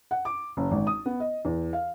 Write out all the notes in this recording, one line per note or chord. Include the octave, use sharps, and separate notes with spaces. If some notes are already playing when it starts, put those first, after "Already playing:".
F#5
D6
F#1
G#1
D#6
B3
D#5
E2
F5